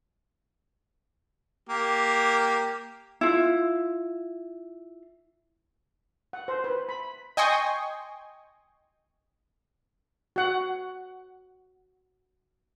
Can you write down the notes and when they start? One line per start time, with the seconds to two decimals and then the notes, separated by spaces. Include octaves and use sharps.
1.69 A#3 G4
3.21 E4 F4
6.33 F#5
6.48 C5
6.64 B4
6.89 B5
7.37 D#5 G5 G#5 C6 C#6 D#6
10.36 F#4 F#5